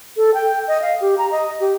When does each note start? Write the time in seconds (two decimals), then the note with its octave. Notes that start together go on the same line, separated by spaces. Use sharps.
0.17 A4
0.34 G5
0.68 D#5
0.82 F5
1.01 G4
1.18 A#5
1.31 D#5
1.60 G4